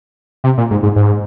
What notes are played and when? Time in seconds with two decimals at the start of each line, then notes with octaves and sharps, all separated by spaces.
0.44 C3
0.58 A#2
0.71 G#2
0.83 G#2
0.96 G#2